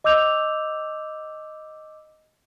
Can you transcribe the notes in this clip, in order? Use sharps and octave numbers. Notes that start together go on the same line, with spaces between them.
D#5 D6 E6 G6 F7